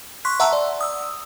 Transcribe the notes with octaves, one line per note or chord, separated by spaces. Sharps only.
C6 C#6 F#6 B6
E5 F#5 A5 A#5 C6 E6
D5
D#6 E6